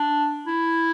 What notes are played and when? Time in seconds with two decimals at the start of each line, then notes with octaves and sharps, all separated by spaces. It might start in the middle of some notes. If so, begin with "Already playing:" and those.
Already playing: D4
0.47 E4